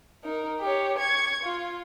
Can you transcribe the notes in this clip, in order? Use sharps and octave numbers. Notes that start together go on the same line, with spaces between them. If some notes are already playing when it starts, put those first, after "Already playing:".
D#4 A#4
G4 C#5
C#6 G#6
F4